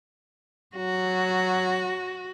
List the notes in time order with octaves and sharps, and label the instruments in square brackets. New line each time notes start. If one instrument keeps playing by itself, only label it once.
[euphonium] F#3 [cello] F#4